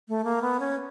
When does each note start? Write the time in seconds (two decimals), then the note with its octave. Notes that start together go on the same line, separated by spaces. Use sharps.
0.09 A3
0.24 A#3
0.42 B3
0.60 C#4